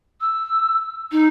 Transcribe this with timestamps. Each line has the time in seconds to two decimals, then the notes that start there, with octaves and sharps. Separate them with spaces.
0.21 E6
1.12 D#4